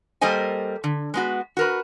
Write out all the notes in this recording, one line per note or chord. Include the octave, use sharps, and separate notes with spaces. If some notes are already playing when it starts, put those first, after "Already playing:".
G3 A#3 A4 C5 D#5 G#5
D3
G#3 B3 F#4
F#4 A#4 B4